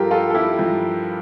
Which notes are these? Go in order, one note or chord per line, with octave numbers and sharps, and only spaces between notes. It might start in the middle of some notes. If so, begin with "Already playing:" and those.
Already playing: G2 F3 F4 G4 A4 A#4
F4 A4
A4
E4 G4
G2 F3